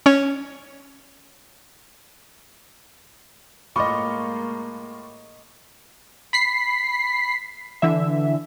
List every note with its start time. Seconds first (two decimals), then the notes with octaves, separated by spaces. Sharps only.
0.06 C#4 C#5
3.76 A2 G#3 A#3 F4 D#5 B5 C#6 D6
6.33 B5 B6 C7
7.82 D3 E3 E5